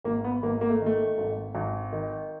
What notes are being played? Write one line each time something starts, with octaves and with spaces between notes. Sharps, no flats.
G#1 A#3
B3
G#1 A#3
A#3
A3
D#3
A3
G#1
G#1
D#3